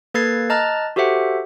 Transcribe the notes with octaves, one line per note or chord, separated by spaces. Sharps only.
A#3 A4 B4 G#6 A6 C7
D#5 A5 A#5 F6 F#6 A6
F#4 G4 A4 C5 E5 F#5